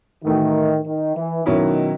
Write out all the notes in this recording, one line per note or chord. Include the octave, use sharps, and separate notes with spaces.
A2 D#3 E3 A3 D#4 F#4
D#3
E3
B2 D#3 F#3 C#4 E4